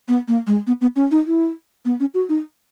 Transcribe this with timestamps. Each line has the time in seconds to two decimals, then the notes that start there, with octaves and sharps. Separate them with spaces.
0.08 B3
0.28 A#3
0.47 G#3
0.67 B3
0.81 B3
0.96 C#4
1.11 D#4
1.27 E4
1.85 B3
2.00 C#4
2.14 F#4
2.29 D#4